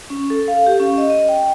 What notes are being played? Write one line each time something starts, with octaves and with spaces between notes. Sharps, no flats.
C#4
A4
F5
G4
C#4
D#5
D#5
G5